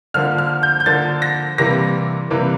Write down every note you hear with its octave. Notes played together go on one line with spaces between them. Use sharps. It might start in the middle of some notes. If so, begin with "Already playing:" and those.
D3 F3 A#3 F6
F6
G6
G6
D3 F3 A#3 A6
A#6
C3 E3 G3 A#3 A#6
C3 E3 G3 A#3